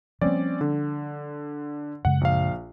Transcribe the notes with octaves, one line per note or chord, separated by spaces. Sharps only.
F3 G3 A#3 C4 C#4 D5
D3
F#2 C#3 G#3 F#5
A#1 F5